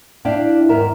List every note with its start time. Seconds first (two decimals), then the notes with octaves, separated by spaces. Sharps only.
0.25 D4 E4 D5 F5 G5
0.69 E2 G#2 D#3 A#4 E5